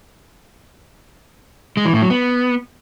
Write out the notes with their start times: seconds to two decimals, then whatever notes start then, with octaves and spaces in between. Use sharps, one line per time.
1.77 G#3
1.85 E3
1.94 A2
2.02 F#3
2.10 B3